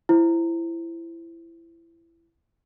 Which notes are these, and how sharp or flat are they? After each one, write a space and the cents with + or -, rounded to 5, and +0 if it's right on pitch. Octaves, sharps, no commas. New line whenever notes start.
E4 +20 C5 +0